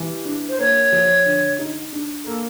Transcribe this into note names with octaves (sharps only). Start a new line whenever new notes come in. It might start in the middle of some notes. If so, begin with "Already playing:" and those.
Already playing: E3 G3
D4
C5
A#3 C#5
F3
D3
D#4
D4
A#3 A4